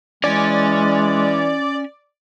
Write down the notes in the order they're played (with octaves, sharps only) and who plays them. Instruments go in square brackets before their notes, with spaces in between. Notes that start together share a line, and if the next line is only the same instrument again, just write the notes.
[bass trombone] E3 [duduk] G#3 [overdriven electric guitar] C#4 G#5 [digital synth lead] D5